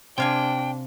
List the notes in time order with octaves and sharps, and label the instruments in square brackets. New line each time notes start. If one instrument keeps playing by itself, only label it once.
[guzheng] C3 F5 G#5 [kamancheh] D4 [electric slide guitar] G5